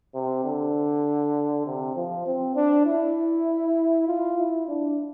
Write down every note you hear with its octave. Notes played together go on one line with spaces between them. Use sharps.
C3
D3
C3
F3
C4
D4
E4
F4
E4
D4